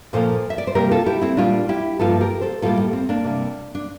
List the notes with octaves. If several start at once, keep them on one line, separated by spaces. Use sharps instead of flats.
A#2 F3 A#3 A4 C5
E5
D5
C5
C3 G3 A#3 G4 A#4
F4 A4
E4 G4
C4 E4
A#2 G3 A#3 D4 F4
E4 G4
G2 F3 A#3 F4 A4
G4 A#4
A4 C5
A2 G3 A#3 F4 A4
A#3
C4
A#3 D4
C3 G3 A#3
D4